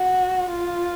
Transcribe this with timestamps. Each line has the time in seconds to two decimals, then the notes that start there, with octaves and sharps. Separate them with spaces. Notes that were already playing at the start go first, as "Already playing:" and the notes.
Already playing: F#4
0.49 F4